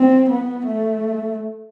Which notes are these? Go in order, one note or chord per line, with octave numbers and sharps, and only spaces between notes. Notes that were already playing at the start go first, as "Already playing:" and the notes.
Already playing: C4
B3
A3